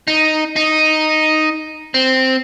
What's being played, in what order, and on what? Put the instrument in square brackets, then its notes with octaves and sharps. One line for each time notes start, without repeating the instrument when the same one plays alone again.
[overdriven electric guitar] D#4
D#4
C4